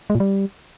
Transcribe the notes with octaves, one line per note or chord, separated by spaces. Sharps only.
G#3
A#2
G3